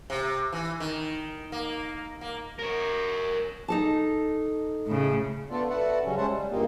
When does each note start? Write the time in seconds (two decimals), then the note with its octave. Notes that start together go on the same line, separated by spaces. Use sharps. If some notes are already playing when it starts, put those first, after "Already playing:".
0.10 C3
0.53 E3
0.80 D#3
1.52 A#3
2.21 A#3
2.59 A#4 C#5
3.68 D#4 A4 A5
4.86 A2 C#3
5.50 A3 B3 D4 F4 A4 D5
5.70 F#4 A4 B4 D5 E5 F#5
6.04 C#3 F#3 G3 C#4
6.17 G#3 C#4 C5 E5 F#5 A5
6.29 G3
6.50 E2 G2 A#2 A#3 D#4 G4